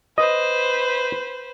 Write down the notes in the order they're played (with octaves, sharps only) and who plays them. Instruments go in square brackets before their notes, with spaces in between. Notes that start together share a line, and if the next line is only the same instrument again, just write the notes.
[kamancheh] B4 C5 [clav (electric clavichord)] D#5